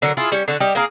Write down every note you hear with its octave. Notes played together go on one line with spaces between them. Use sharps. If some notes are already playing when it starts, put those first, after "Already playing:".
D3 F#3 A#4
E4 F4 G#4
G3 C#4
D3 F#4
G3 G4 D#5
A#3 G#4 A#4